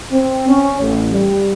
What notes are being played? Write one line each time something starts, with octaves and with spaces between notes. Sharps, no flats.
C4
C#4
A1
G3